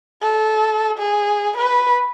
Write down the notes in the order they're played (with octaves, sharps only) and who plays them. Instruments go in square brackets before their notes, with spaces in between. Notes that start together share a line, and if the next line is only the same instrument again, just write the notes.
[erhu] A4
G#4
B4